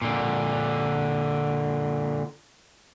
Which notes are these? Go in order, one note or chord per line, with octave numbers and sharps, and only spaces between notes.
A#2 D3